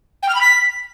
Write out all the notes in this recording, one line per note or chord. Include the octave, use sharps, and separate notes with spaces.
G5
F6
B5
B6